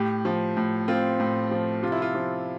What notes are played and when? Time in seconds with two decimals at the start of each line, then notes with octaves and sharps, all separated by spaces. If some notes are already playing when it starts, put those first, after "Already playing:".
Already playing: A2 G4
0.25 F3
0.57 A2
0.88 C4 F4
1.20 A2
1.51 F3
1.83 C3 F4
1.92 E4
2.02 F4
2.15 F3